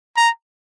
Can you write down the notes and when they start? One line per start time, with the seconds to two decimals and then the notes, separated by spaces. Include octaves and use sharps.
0.17 A#5